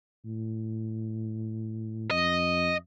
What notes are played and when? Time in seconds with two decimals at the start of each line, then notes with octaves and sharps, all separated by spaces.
0.25 A2
2.11 F2 D#5